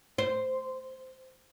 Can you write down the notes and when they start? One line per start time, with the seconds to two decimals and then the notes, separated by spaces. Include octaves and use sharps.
0.18 C5